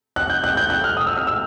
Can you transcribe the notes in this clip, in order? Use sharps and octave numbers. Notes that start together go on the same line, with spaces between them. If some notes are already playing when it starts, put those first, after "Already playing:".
F#6
G6
F#6
G6
F#6
F6
D#6
E6
F6
E6